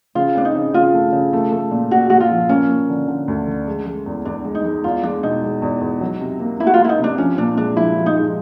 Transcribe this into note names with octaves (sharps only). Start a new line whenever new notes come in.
C#3 F4
C4 D4
D#4
C#3
C#3 F4
A3
C#3
A3
A3
A#2
A#2 F#4
A#2 F#4
F4
F3
A#3 C#4
A#3
D3
D3
D2
D3
G#3
G#3
E2
E2 D4
G#3
D#4
G#3
E2 F4
G#3 D4
B2 D#4
G#3
E2
E2
F#3
C3
A#3
A#3 E4
F#4
F4
A#3 E4
D#4
C3 D4
F3 C#4
A#2 D4
G#3 D4
F3 E4
F3
D#4
G#3